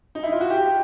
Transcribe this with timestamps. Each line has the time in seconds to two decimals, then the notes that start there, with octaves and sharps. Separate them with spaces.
0.15 D#4
0.23 E4
0.32 F4
0.41 F#4
0.50 G4